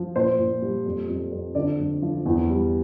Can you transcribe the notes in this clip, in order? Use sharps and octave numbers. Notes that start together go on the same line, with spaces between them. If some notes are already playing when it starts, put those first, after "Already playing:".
Already playing: F3
A#2 C5
A#2
G3
F2
F2
F2
D3 D5
F2
F3
E2
G3